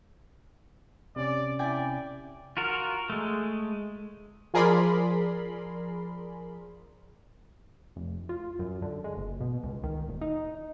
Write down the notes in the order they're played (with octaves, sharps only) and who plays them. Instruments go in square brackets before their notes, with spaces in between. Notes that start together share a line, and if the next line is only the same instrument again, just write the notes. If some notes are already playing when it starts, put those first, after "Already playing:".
[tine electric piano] C3 C#4 [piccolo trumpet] D5
[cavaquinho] E4 G5 G#5 [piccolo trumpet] D5
[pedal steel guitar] F4 F#4 A#4
G#3 A3
[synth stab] F3 G#4 A#4 D5 B5 C6
[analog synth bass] F1
F4
F#2
D3
G#3
F#1
B2
C#2
D#3
D#1
D#4